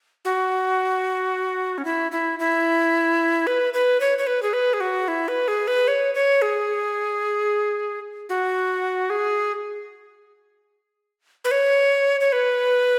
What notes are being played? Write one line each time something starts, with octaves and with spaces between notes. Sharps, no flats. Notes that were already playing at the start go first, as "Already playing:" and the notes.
F#4
C#4
E4
E4
E4
B4
B4
C#5
C#5
B4
G#4
B4
G#4
F#4
E4
B4
G#4
B4
C#5
C#5
G#4
F#4
G#4
B4
C#5
C#5
B4